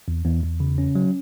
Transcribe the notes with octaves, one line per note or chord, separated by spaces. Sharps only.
E2
E2
E2
C#3
C#4
F#3